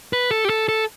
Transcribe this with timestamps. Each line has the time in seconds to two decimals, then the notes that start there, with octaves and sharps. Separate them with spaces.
0.13 B4
0.31 A4
0.45 G4
0.50 A4
0.69 A4